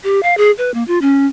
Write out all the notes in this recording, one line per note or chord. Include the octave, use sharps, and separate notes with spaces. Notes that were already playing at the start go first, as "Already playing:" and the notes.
G4
F5
G#4
B4
A#3
F4
C#4